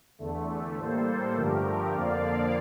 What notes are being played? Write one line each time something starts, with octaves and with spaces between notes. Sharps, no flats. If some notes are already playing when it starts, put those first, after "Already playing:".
E2 D3 A3
A2 G3 A#3 A4 C5
G2 D3 F3 A3 G4 A#4
F2 D3 F3 A#3 D5 F5